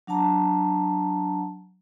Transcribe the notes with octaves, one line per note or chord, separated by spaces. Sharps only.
F#3 D4 F#5 A5 A#5